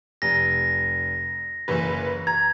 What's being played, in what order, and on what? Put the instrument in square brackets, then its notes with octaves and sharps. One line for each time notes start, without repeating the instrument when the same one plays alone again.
[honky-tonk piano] F1 [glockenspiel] A#6
[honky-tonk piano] F#1 E3 B4
[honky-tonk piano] A#5 [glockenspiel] G#6